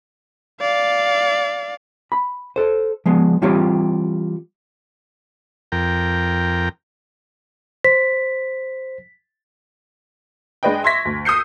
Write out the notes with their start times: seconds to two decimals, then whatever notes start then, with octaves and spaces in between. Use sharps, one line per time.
0.61 D5 F5
2.12 B5
2.56 A4 C5
3.06 F3 G#3 B3
3.42 E3 G3 C4 F4 G4 C#5
5.72 F2 A#4 G5
7.84 C5 B6
10.63 G#3 D4 B4 D#5 G5
10.84 E5 C6 C#6 G#6 A#6 B6
11.05 D2
11.25 D#6 E6 G6 C7 C#7